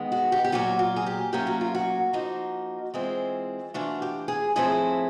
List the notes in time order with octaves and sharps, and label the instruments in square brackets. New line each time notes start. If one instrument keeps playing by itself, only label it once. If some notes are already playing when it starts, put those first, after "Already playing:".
Already playing: [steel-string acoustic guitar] D#3 G#3 B3
F#4
G4
G4
A#2 F#3 A#3 F#4
F4
G#4
G4
A2 F#3 A#3 C#4 F4 G4
F#4
F4
F#4
F3 A#3 D#4
E3 G#3 C4 F4
E3 A3 D4 F4 F#4
G4
G#4
A2 F3 A3 C4 E4 G#4